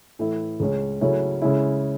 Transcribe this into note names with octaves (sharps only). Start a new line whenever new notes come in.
A2 E3 A3 E4
C#2 C#3 G#3 C#4
C#3 F#3 A3 C#4 E4
C#3 G#3 C#4 E4